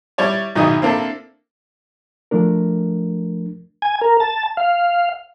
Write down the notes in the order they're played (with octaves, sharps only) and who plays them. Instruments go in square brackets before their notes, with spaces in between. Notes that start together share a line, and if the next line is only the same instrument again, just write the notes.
[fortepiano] G3 E4 C#5 D5
B1 G#2 D#3 E4 D#5
A#3 C4 D4 E4 A4
[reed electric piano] F3 A3 D4 A#4
[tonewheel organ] G#5
A#4
A5
F5